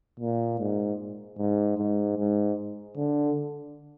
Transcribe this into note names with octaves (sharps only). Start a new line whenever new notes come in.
A#2
G#2
G#2
G#2
G#2
D3